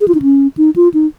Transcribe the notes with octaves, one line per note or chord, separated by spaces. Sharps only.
G#4
F4
D#4
C#4
D#4
F4
D#4